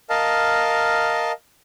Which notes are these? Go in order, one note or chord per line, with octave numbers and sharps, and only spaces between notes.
A#4 D#5 F5 A5